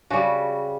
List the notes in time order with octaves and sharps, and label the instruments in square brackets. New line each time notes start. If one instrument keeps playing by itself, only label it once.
[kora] C#3 G3 F#4